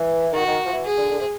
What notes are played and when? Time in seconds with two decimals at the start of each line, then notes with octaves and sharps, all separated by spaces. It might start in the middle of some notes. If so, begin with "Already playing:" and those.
Already playing: E3
0.33 D#3 F#4
0.46 D#3
0.65 F3
0.72 E3
0.85 G#4
0.98 D3
1.11 D3
1.19 C3